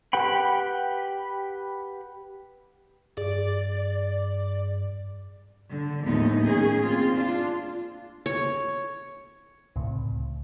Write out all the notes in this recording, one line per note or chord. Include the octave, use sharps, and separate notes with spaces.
G4 B4 F#5 G5 B5
G2 G#4 D5
D3
D#2 A2 F3 G#3 B3 D#4
A#3 C#4 D#4 G#4
C4 F4
D4 F4
C#5
C#2 A2 C3